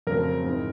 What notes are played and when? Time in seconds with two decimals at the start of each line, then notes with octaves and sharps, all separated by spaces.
0.07 F2 C#3 F#3 A3 C4 A#4
0.44 G#2 E3 G#3 C4